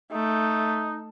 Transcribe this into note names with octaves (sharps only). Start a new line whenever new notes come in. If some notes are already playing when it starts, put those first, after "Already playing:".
A3 D#4